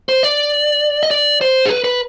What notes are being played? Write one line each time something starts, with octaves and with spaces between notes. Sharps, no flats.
C5
D5
D#5
D5
C5
G#4
B4
B4